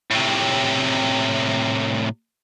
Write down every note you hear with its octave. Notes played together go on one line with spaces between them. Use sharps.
A2 C3